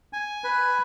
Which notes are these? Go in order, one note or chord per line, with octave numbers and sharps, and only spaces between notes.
G#5
B4